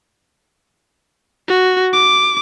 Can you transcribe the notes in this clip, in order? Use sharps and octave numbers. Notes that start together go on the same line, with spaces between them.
F#4
D6